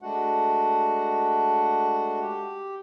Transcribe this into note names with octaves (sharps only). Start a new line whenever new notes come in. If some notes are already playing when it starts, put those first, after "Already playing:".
G#3 A3 D4 F#4 F#5
G4